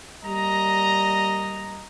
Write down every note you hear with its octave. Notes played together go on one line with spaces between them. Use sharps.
G3 A#3 D#5 A#5